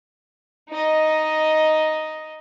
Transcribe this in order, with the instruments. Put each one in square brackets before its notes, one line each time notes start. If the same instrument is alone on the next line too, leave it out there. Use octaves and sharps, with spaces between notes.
[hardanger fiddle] D#4 D#5